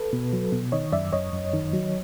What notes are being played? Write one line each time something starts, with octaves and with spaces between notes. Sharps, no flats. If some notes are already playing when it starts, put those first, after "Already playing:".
Already playing: A4 B4
B2
F#3
B2
D#3 C#5 D#5
F#2 D5 E5
F#2 C#5 D#5
F#2
D#3
F#3